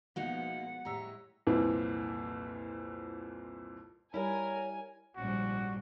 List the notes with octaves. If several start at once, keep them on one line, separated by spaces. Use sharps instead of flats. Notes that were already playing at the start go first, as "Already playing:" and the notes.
B2 F3 G#3 A#3 B3 D#4 F#4 F#5
A2 G3 G#3 C#5 E5 A#5
C2 F2 A#2 E3
G3 E4 A#4 C#5 G#5
A#1 G#2 F3 G3 C#4 F#4